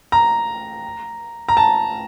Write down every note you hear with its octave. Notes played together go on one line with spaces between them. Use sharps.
A#5
A#5
A5